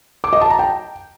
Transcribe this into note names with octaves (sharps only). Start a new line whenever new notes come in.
D6
D#5
A5
A#5
G5